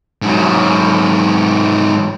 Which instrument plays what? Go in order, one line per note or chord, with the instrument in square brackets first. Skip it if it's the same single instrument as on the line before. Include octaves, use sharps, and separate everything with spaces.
[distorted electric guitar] G#2 F#3